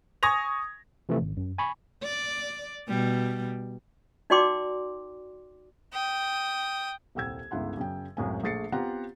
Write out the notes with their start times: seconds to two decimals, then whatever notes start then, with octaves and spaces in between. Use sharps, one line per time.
0.23 G#5 C#6 D#6 G#6 A#6 F7
1.09 C3 E3 F3 A3
1.21 G#1
1.37 F#2
1.58 G#5 B5 C#6
2.03 D5
2.88 B2 G3
4.30 D#4 F#4 D5 G5 C6 D6
5.92 G5 D#6
7.15 D#1 C2 G5 E6 G#6
7.51 G1 C#2 C#3 E4 F#5 C6
7.77 F#2 C#3 G5
8.17 C#2 F#2 A2 C4 G#5
8.43 A#1 A3 G#4 A6 C7 C#7
8.72 B3 C4 F4 G4 F#5 A#5